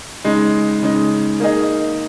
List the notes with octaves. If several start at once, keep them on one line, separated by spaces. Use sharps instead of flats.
C#3 G#3 D#4
C#3 G#3 D#4
A#3 D#4 G#4 D#5